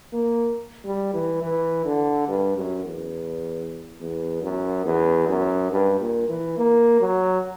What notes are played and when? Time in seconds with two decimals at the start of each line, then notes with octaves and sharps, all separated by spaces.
0.13 A#3
0.85 G3
1.14 E3
1.42 E3
1.85 D3
2.28 G2
2.57 F#2
2.86 E2
4.00 E2
4.43 F#2
4.85 E2
5.29 F#2
5.71 G2
6.00 A#2
6.29 E3
6.57 A#3
7.00 F#3